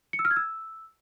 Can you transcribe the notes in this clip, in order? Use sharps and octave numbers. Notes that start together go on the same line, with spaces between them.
C#7
E6
F6
G#6
E6